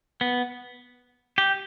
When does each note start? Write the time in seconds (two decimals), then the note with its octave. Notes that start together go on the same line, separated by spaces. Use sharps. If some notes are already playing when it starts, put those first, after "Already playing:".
0.21 B3
1.38 G4